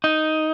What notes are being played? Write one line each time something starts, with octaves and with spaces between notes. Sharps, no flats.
D#4